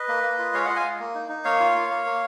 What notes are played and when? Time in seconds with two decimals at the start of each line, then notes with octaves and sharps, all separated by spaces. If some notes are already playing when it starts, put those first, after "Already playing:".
Already playing: B4 D#5
0.09 A#3
0.23 A#3
0.38 F4
0.54 G#3 C#5 F5
0.65 F4 D#5 F#5
0.76 F5 G#5
0.84 G#3
0.99 A#3
1.15 D#4
1.29 D#4
1.45 A#3 C#5 F5
1.60 F4
1.75 A#3
1.90 A#3
2.06 A#3